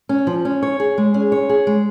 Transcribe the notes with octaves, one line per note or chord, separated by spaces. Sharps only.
C#4
F3
C#4
C#5
G#4
G#3
C#4
C#5
G#4
G#3